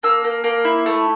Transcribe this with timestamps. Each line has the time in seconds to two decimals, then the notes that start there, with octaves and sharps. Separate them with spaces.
0.03 A#3 E6
0.24 A#3
0.44 A#3
0.65 E4
0.86 A3